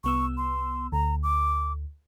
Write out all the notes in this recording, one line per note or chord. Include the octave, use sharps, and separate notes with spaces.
C2 B3 C#6 E6
C6
D2 A#5
D6